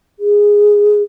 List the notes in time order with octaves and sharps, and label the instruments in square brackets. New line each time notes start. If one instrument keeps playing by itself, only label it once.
[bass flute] G#4